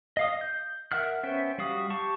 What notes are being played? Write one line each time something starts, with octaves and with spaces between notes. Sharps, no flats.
D#5 F5 D#6
G6
A#4 E5 F#5 F6 F#6
B3 C#4 C5 E5 G5
G3 F#4 F5 D#6
G4 A5 C#6